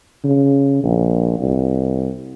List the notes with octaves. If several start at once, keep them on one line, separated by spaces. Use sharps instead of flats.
C#3
A#1
C2